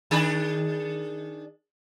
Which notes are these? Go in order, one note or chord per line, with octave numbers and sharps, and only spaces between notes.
D#3 D4 G#4